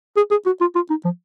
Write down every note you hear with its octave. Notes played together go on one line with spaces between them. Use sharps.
G#4
G#4
F#4
F4
F4
D#4
F3